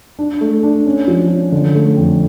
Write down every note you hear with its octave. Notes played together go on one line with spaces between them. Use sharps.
D4
A3
D4
C#4
F3
C#4
D3
A3
F2